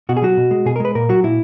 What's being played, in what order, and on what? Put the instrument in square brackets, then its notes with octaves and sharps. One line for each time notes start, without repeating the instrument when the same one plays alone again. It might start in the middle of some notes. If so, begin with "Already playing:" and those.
[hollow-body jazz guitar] B2 F#4
G#4
F#3 F#4
B2
G#3
B2 G#4
A#4
G#3 B4
A#2 A#4
F#3 F#4
A#2 E4